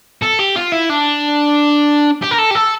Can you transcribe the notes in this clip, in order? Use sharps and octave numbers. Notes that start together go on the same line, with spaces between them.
A4
G4
F4
E4
D4
G4
A#4
A4
G4
A4